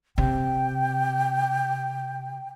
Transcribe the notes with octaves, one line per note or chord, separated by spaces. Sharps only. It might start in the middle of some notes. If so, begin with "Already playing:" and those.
C3 G5